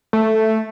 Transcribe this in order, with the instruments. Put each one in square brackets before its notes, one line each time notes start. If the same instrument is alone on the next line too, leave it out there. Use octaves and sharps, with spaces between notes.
[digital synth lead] A3